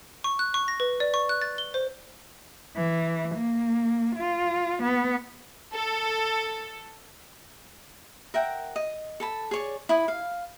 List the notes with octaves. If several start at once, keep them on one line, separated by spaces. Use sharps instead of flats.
C#6
F#6
C#6
A#6
B4
D5
C#6
F#6
A6
G7
C5
E3
A#3
F4
B3
A4
A#4 E5 F#5 G5
D#5
A4 A5 B5
G#4 C#5 D5
E4 B5 D#6
F5